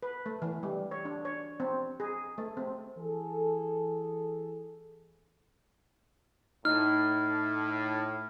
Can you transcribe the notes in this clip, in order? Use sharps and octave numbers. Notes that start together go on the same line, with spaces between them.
B4
A3
E3
G3
C#5
D4
C#5
C4
G#4
A3
C4
E3 G#4 A4
A2 D#4 F6